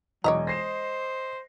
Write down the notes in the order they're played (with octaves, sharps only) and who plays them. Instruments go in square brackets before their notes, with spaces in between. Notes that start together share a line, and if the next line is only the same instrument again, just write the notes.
[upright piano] E1 D6 [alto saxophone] F#3 [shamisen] C#5 E5 A#5 [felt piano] D#5
[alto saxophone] C5 [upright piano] A#6 C7 E7